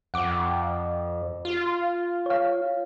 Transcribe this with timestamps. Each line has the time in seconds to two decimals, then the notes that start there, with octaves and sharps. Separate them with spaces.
0.14 F2 F#5 D6
1.45 F4
2.26 C#5 F5